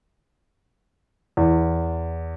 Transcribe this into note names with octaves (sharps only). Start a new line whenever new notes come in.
E2